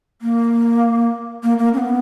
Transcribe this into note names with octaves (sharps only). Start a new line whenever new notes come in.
A#3
A#3
A#3
C#4
B3